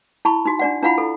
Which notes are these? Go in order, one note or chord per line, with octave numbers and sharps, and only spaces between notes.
E4 A5 B5 C#6
D#4 F#4
D4 D5 F#5
D4 E4 F4 F5 F#5 B5
E4 A4